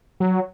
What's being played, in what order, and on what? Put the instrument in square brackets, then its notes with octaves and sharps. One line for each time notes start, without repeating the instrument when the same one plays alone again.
[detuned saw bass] F#3